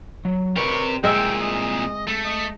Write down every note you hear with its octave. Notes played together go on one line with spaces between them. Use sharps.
F#3
C3 G4 A#4 B4 D5 C#6
C2 A#2 G#3 C4 E5 G5
D#5
A3 A4
D#5